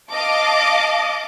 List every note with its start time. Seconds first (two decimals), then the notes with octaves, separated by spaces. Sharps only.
0.11 D#5 F5 A5 D6